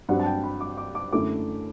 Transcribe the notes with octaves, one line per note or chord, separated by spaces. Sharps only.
G2 F#3 C4 F#5
A5
G5
B5
D6
D6
D6
F#2 D3 A3 E4 D6